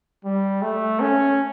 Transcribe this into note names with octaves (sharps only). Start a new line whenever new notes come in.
G3
A3
C#4